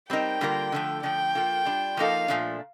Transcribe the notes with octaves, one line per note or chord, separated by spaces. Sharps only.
G3 C4 D#4 A#4 G5
D3 G3 A#3 F4 A#4
D3 F3 A3
D3 F3 A3 G5
F3 A#3 F4 A4
G3 D4 F4
F3 A#3 D#4 A4 F5
A#2 F3 A3 D4